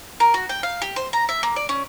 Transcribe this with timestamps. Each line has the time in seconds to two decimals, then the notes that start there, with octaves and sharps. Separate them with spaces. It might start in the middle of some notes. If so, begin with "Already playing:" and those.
0.20 A#4
0.34 F#4
0.49 G5
0.63 F5
0.82 G4
0.96 C5
1.13 A#5
1.29 E5
1.43 A#3
1.56 D5
1.69 C#4